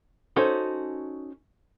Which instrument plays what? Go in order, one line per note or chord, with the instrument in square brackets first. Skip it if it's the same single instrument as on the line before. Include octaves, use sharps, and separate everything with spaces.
[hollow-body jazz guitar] C#4 D#4 F#4 A4 C5